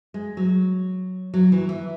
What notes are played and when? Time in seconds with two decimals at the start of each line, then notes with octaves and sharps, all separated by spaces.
0.14 G#3
0.37 F#3
1.34 F#3
1.52 E3
1.69 E3